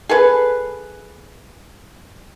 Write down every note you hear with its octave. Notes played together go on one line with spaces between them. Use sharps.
G#4 A4 B4